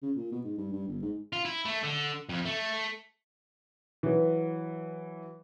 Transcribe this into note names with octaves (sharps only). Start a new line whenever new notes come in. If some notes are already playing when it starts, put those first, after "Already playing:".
C#3
A#2
B2
G#2
G2
G2
G1
G#2
F4
E4
A3
D3
F2
A3
E3 F#3